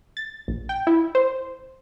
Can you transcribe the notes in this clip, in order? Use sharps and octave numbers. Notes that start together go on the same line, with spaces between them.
A6
A#1
G5
E4
C5